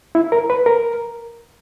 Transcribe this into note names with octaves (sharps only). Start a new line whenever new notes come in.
E4
A#4
B4
A#4